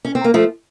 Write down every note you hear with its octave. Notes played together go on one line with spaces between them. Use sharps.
C#4
C4
A#3
F3 A3